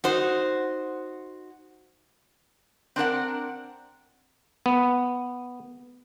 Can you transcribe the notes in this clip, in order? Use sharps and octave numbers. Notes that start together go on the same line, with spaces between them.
D#4 F#4 C5
C4 D4 A#4 F#5
B3